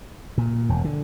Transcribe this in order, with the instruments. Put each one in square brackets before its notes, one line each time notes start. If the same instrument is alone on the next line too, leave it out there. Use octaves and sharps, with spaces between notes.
[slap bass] A#2
E1
D3